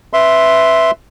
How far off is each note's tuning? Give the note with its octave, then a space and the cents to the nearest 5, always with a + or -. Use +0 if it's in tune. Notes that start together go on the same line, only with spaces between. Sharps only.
B4 +10 E5 +0 C6 +0